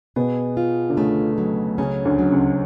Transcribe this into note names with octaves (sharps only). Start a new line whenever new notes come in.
B2 B3 G#4
F4
D3
C#2 C#3 A3
F#3
C#2 C#3 C#4
D2 D3
F#3
C#2 C#3